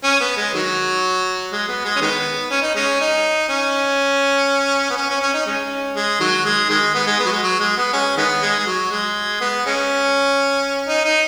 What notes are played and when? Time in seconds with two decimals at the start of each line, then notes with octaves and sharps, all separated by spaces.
0.04 C#4
0.20 B3
0.37 G#3
0.54 D#3 F#3
1.52 G#3
1.68 B3
1.85 G#3
1.96 C#4
2.01 D#3 G#3 B3
2.51 C#4
2.62 D#4
2.75 G#3 C#4
3.00 D#4
3.49 C#4
4.90 B3
4.97 C#4
5.10 C#4
5.22 C#4
5.34 D#4
5.46 G#3 C#4
5.96 G#3
6.20 D#3 F#3
6.45 G#3
6.69 D#3 G#3
6.94 B3
7.07 G#3
7.19 B3
7.26 F#3
7.32 G#3
7.43 F#3
7.60 G#3
7.77 B3
7.93 G#3 C#4
8.17 D#3 G#3 B3
8.42 G#3
8.59 G#3
8.66 F#3
8.91 G#3
9.41 B3
9.65 G#3 C#4
10.88 D#4
11.05 D#4